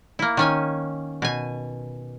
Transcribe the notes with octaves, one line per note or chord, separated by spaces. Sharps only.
A#3 E4
D#3 C#4 G#5
B2 G#5